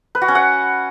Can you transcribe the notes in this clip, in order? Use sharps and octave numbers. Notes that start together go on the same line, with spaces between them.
B4
F#4
C#4
F#5